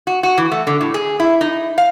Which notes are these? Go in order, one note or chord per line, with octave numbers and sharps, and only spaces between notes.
F#4
F#4
E3
A3
D3
A2
G#4
E4
D#4
F5